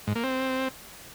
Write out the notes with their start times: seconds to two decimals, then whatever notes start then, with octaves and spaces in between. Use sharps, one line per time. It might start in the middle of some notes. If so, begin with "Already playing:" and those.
0.07 G#2
0.16 A#3
0.24 C4